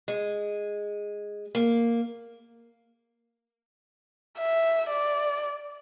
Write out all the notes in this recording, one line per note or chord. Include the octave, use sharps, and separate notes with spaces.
G#3
A#3
E5
D5